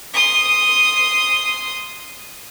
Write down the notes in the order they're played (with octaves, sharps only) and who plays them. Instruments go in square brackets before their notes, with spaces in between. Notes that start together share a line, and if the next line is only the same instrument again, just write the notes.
[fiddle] C6 D#6